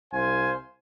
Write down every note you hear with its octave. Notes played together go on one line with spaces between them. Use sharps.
C2 C5 F5 G#5